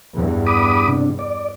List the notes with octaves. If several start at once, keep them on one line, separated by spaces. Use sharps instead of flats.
E2 G2
B5 D6 D#6
C3 D4
D5